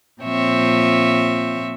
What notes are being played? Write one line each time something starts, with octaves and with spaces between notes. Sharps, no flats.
A#2 F3 C4 C#5 E5